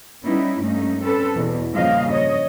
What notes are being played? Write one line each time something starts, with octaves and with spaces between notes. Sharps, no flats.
G3 B3 C#4 D#4 E4
G2 A3 A#3 C#4 D#4
C4 C#4 A4 B4
E2 B2 E3
G2 A#2 C#3 F3 D#5 F5
C#5 D#5